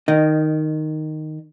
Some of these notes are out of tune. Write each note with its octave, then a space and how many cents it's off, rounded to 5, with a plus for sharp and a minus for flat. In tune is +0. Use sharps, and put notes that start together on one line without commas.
D#3 -5 D#5 -20